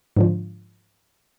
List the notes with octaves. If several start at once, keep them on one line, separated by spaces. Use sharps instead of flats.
G#2 D3 F3